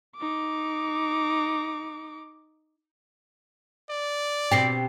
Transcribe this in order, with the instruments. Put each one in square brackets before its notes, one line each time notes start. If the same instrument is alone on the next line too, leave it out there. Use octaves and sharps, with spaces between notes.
[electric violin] D#4 D6
[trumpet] D5
[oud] B2 C4 G4 [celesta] G5 C7